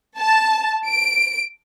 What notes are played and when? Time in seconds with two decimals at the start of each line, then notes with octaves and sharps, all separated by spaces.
0.17 A5
0.87 D7